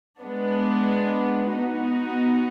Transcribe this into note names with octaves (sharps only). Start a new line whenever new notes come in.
G#3 B3 D4
B3 D#4 F#4